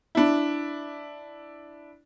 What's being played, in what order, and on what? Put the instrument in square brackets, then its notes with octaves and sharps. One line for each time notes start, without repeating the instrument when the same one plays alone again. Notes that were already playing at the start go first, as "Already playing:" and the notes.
[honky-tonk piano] D4 E4